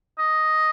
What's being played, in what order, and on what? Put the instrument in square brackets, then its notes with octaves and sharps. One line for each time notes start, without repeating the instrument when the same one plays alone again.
[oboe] D#5